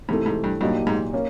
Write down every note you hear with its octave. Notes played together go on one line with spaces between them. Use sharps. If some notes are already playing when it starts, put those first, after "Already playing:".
G#2 C3 E3 A3
G#2
G2
G2 A#2 F#3 A#3 D#4 G4
G#2
A#3 C#4